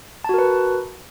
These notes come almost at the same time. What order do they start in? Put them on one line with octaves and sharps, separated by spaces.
A5 F#4 A#4 B4